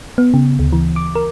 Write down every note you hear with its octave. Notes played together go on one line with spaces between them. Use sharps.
B3
C#3
D2
E3
D6
A#4